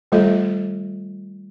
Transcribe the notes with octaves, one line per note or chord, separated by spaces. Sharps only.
D#3 G3 A3 F4 A4 D#5